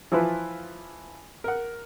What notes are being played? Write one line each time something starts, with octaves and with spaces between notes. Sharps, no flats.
E3 F3 E4 F4 B4
A#4 F#5